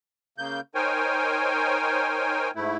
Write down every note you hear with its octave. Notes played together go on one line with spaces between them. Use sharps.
C#3 A#3 G6
D#4 A#4 C5 C#5 G5 G#5
G#2 A3 E4